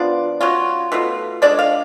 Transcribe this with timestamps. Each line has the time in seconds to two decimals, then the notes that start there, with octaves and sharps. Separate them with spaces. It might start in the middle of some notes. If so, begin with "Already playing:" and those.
Already playing: F3 B3 D4 F4 D5
0.41 F#3 C#4 F4
0.92 B2 A3 F4
1.42 D3 G#3 D4 D5
1.59 F5